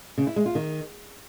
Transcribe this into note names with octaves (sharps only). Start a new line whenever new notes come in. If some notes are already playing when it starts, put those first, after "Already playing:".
C#3
E4
G#3
F4
D#3